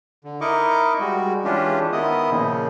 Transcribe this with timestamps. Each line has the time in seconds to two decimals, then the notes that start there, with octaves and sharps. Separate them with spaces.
0.24 D3
0.41 D#4 E4 A#4 D#5 C#6 D6
1.00 G3 G#3 F#4
1.45 E3 G#3 C#4 D4 F4 G4
1.92 D#3 B3 E4 D#5 D#6
2.30 A#2 C#3 F3